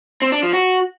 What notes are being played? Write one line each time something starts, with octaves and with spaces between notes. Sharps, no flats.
C4
D4
F3
F#4